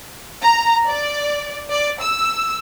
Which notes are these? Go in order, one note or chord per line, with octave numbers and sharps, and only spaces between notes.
A#5
D5
D5
E6